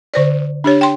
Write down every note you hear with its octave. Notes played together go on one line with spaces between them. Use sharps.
D3 C5 D5
D4 G4 C#5
G5 C6